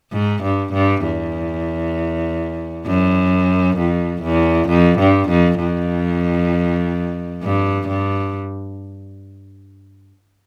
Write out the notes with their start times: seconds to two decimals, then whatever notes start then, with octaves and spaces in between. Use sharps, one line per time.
0.12 G#2
0.43 G2
0.73 G2
1.03 E2
2.86 F#2
3.78 F2
4.23 E2
4.69 F2
4.99 G2
5.29 F2
5.60 F2
7.43 G2
7.88 G2